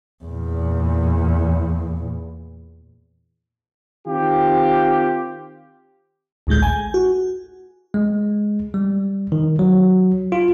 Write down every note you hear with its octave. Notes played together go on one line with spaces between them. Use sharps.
E2 A#2
D#3 C4 F4 G4
A1 D2 A2 G#3 G6
G#5
F#4
G#3
G3
D#3
F#3
F4